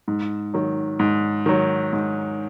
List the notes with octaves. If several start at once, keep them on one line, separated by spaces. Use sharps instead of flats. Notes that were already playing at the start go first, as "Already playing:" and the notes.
G#2
D#3 F#3
G#2
D#3 F#3
G#2